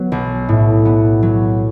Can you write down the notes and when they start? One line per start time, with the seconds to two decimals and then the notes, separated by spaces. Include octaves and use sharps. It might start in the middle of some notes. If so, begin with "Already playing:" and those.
Already playing: F#3 B3
0.12 B1
0.49 A2
0.85 B3
1.23 F#3